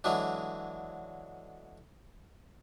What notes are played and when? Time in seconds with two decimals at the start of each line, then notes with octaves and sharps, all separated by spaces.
0.04 D3 E3 F#3 G#3 D4